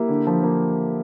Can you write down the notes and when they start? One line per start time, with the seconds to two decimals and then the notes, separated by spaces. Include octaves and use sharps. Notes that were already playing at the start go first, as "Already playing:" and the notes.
Already playing: A#3 E4 G4
0.09 D3
0.27 F3
0.43 A#3